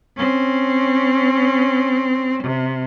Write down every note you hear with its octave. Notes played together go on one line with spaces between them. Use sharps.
C4 C#4
C3